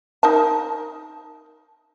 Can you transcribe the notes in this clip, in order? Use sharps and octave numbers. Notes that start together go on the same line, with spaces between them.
D#4 A#4 A5